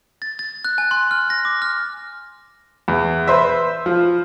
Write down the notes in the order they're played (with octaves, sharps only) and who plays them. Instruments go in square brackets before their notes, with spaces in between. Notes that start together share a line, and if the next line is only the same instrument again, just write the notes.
[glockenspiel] A6
A6
F#6
G#5
C6
F6
A#6
D6
F6
[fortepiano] E2
B4 C5 E5
F3